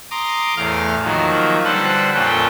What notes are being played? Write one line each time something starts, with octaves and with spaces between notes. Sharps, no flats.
A#5 C6 D6 D#6
E2 A2 F5 F6
D#3 F3 F#3 A#3
D3 G3 A4 B4 C5 F#5
F2 A#2 C#4 F4 A4 G5